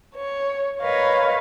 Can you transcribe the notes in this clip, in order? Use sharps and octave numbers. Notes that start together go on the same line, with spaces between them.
C#5
A#4 B4 C#5 D#5 F5